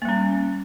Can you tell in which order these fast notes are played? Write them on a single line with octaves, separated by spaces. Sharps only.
A#3 G3 C#4